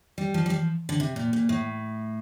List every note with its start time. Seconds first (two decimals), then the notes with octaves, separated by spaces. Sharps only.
0.18 G3
0.34 F3
0.46 G3
0.50 F3
0.89 D3
1.00 C3
1.16 A#2
1.33 A#2
1.49 A2